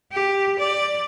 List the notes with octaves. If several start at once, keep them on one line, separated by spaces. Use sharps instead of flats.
G4
D5